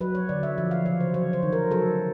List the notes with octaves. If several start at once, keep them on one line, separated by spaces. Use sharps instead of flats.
F#3 B4
C#5
D3 D5
E5
F3 E5
F5
C#3 C#5
C5
F#3 C#5
C5
D#3
A#4
F#3 A4